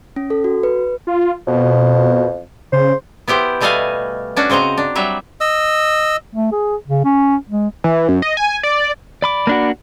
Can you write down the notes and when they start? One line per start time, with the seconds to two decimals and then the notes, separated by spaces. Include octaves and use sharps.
0.16 C#4
0.30 A4
0.44 F#4
0.63 B4
1.07 F4
1.47 F2 B2
2.72 C#3 C5
3.28 B3 E4 G4 C5
3.60 B2 G3 A3 D#5 F5 G#5
4.36 C#4 D4 F#4
4.50 C#3 C4 C5 D#5 A#5
4.77 D4
4.95 F#3 G3 E5
5.41 D#5 E6
6.35 A3
6.52 G#4
6.87 C#3
7.05 C#4
7.49 G#3
7.84 E3
8.08 F#2
8.22 D#5
8.37 G#5
8.63 D5
9.22 D5 B5 D6
9.47 A#3 D4 F#4